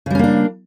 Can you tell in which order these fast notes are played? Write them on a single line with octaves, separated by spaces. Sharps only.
C#3 G3 C#4 A#3 D4